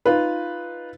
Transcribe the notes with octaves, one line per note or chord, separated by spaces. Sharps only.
D#4 F4 B4